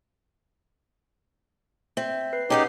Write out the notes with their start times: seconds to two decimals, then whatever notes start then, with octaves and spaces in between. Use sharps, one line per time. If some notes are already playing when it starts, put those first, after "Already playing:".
1.97 C4 E5
2.33 B4 C7
2.50 C#4 D#4 G4 G#4 F#5